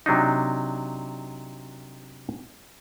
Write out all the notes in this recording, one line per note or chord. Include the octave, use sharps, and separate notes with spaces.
C3 F#3 D4 D#4